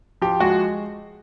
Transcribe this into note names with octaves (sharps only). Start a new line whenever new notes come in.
F3 G4
G#3 F#4